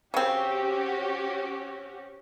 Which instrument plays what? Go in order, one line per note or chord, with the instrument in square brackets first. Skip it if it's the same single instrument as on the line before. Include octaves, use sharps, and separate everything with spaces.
[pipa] C#3 C4 [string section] C#4 F#4 G4